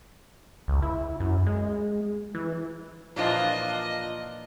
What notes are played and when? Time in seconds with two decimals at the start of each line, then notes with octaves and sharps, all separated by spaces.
0.68 C#2
0.82 E4
1.20 F#2
1.46 G#3
2.35 E3
3.16 A#2 E3 F3 A#3 D4 F4 D#5